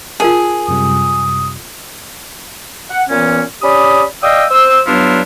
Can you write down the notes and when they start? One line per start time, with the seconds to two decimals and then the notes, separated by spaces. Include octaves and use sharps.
0.20 F4 G#4 A#4 A5
0.68 F#2 C3 G3 D#6
2.90 F#5
3.09 A#2 E3 B3 C#4
3.62 C#4 G4 D5 B5 D#6
4.23 D5 D#5 F5 G5 D#6 E6
4.50 C5 E6
4.86 G2 F#3 B3 D4 E4 F4